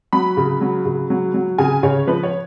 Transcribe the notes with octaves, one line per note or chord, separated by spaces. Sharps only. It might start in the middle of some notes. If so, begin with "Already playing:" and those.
F#3 B5
C#3
F#3
C#3
F#3
F#3
C#3 G#5
C#3 C#5
F3 B4
C#5